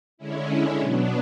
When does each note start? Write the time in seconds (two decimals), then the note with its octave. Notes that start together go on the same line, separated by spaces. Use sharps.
0.18 D3 G#3 C#4 E4
0.80 B2 F#3 B3 D4